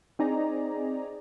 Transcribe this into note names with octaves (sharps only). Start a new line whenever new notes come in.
C4 D#4 G#4 D5 A#5